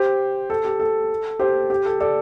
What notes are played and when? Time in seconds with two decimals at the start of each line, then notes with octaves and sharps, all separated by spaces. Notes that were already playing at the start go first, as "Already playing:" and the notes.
Already playing: G4 C5
0.50 A4
0.65 G4
0.80 A4
1.39 G4 C5
1.70 G4
1.85 A4
2.00 A4 D5